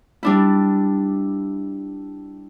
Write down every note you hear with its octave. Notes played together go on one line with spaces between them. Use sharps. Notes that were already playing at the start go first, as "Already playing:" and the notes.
G3 D4 E4